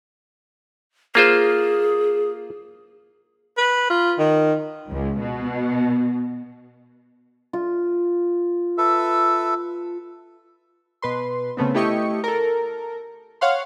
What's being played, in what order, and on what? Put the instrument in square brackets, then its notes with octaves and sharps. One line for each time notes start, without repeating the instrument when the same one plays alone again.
[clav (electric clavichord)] A#3 F4 C5 [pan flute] G#4
[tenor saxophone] B4
F4
D#3
[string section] C#2
B2
[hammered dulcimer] F4
[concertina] A4 B4 E5
[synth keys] B2 B4 C6
C#3 A3 B3 C4
A3 E4 G4 D#5 C#6 C#7
A4 A#4
C#5 F5 F#5 C6